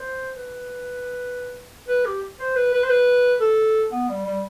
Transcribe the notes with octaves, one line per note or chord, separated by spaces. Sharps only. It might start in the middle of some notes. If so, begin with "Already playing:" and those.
Already playing: C5
B4
B4
G4
C5
B4
B4
C5
B4
A4
B3
G3
G3